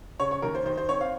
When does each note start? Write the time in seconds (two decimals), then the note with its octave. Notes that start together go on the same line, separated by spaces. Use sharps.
0.20 C#3 C#5
0.31 C#5
0.42 D#2 A#4
0.55 C5
0.66 D#3 C5
0.77 C5
0.89 C4 C#5
1.01 F5